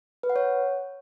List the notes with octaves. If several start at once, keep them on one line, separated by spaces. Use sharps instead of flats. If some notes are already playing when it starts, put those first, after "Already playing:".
B4
F#5
C#5